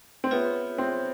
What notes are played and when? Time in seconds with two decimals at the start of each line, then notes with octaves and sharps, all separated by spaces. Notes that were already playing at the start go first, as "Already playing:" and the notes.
0.24 C4
0.31 B3 F4 G#4 C#5 E5
0.78 C4